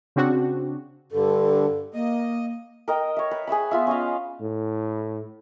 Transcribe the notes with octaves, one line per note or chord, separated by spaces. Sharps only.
C#3 C4 D4 F#4
G2 D3 A4
A#3 D#5
A#4 D#5 G5
C#5 E5
B4
G#4 B4 E5 B5
B3 F4 E5
C#4 D#5 F5
A2